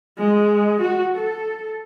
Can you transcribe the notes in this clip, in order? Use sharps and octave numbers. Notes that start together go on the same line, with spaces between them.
G#3
F#4
A4